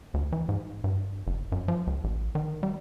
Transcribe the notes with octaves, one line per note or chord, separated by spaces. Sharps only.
D2
E3
G#2
G2
F#1
F#2
F3
C#2
A1
D#3
G3